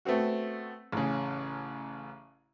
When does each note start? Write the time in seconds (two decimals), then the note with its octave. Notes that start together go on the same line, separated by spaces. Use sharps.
0.05 A3 B3 C4 F#4
0.92 A1 C#3